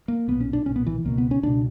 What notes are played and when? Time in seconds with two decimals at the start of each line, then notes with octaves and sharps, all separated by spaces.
0.08 A#3
0.28 B1 A#2 B3
0.41 C#4
0.53 D4
0.66 B1 A#2 C#4
0.76 B3
0.86 E3
1.05 C#2 B2 A#3
1.18 B3
1.31 C#4
1.43 C#2 B2 D4